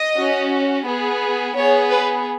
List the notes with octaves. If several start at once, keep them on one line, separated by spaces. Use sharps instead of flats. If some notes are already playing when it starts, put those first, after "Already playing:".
Already playing: D#5
C#4 F#4
B3 G#4
B3 G#4 C#5
B4